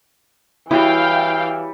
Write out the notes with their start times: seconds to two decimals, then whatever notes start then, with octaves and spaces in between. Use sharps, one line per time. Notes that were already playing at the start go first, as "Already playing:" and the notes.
0.71 E3 G3 E4 F#4 C#5 F5 G5 D#6